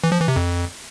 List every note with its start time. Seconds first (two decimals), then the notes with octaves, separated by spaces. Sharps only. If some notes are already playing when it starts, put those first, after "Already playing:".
0.04 E3
0.12 F3
0.20 E3
0.28 C3
0.36 F2